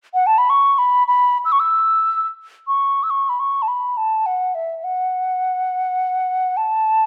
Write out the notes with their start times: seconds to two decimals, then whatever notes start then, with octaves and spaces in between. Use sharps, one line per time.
0.14 F#5
0.27 A5
0.38 B5
0.50 C#6
0.78 B5
1.08 B5
1.45 E6
1.52 C#6
1.60 E6
2.67 C#6
3.03 E6
3.10 C#6
3.29 B5
3.40 C#6
3.62 A5
3.68 B5
3.97 A5
4.26 F#5
4.55 E5
4.84 F#5
6.57 A5